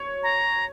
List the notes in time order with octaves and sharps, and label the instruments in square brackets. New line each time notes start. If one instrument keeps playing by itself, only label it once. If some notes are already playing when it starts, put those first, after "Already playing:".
Already playing: [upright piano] C#5
[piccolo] A#5